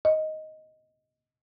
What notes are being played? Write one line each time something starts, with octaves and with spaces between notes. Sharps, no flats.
D#5